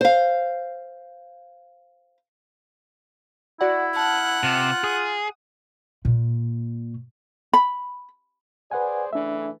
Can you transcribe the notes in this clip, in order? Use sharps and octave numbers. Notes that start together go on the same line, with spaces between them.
C5 F5
E4 F#4 D5 F#5
F#5 A5 F6
C3 F4
G#4 D#6
A#2
B5
G#4 B4 C5 D5 F#5 G#5
C#3 E3 A3 D4 E5